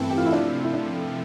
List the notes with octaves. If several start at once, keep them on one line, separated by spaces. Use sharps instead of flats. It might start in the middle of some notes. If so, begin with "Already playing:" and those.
Already playing: G2 E3 A3 B3 C4 E4 A4
G4
F4
E4
C3 F3 A3 D4
E4
D4